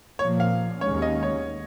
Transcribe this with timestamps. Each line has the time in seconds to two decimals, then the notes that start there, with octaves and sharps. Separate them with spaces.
0.19 A#2 F3 A#3 C#5
0.40 F5
0.81 D#2 D#3 G#3 C#4 C#5
1.02 D#5
1.23 C#5